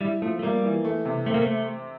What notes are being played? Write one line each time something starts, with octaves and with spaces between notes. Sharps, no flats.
G3 E4
F3 A3
A3
G3 A#3
E3
A3
C3
A3 C4
A#3
A3